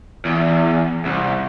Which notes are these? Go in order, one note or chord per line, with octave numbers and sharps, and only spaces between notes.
E2
C2